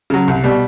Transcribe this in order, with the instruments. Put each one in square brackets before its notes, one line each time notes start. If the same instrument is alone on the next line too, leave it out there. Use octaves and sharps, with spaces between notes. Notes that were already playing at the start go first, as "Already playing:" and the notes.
[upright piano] C#3 F#3
C2
B2 G3